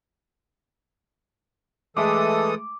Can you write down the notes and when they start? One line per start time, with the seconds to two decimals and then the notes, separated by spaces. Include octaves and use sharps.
1.97 E3 G#3 A3 A4 E5 D6 D#6